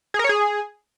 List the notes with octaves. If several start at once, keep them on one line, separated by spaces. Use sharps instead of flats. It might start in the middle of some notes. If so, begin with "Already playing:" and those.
G#4
A#4
C#5
G#4